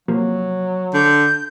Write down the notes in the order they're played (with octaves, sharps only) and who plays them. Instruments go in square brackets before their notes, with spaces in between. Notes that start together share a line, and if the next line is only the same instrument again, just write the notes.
[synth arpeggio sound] C3 F3 A#3 [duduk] F#3
[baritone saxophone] D3 [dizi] G6